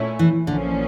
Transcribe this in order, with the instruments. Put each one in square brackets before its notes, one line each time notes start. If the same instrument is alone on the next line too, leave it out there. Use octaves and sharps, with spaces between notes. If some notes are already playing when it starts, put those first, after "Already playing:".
Already playing: [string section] A#2 A3 C#4 E4
[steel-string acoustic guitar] E3
[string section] A#1 A#2 F3 C#4 [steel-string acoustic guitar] D3